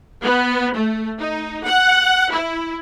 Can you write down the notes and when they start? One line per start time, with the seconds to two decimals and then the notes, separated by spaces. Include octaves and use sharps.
0.23 B3
0.74 A3
1.19 D#4
1.64 F#5
2.32 E4